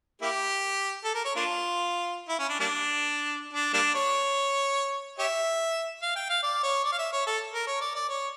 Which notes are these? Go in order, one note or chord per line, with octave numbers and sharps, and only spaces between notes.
A#3 E4 G4
A4
A#4
C#5
A#3 D4 F4
E4
C#4
D4
G3 A#3 D4
D4
G3 A#3 D4
C#5
G4 C#5 E5
F5
G5
F5
D5
C#5
D5
F5
E5
C#5
A4
A#4
C#5
D5
D5
C#5